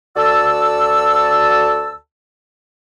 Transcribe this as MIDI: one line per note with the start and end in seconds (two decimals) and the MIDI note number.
0.17 1.96 38
0.17 1.96 66
0.17 1.96 69
0.17 1.96 74
0.17 1.96 81
0.17 1.96 88